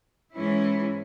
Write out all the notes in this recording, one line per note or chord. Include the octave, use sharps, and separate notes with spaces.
G#2 E3 G#3 C#4 E4